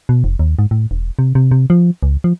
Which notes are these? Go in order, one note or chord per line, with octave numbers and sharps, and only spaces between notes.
B2
F1
D#2
G#2
A2
E1
C3
C3
C3
F3
C#2
F3